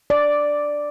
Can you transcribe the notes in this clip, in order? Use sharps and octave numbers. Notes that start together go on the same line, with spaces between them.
D5